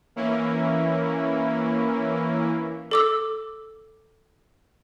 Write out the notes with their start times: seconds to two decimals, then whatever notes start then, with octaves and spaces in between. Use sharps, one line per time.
0.16 E3 A#3 C#4 E4
2.91 A4 D6 E6